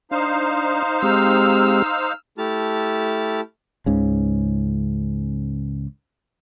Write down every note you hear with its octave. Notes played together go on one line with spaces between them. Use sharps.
D4 D#4 C5 F5
G#3 C4 G4 E6 F6
A3 E4 G4 A5 F6
C#2 G#2 C#3